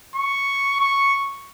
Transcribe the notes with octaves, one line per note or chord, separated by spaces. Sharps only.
C#6
C#6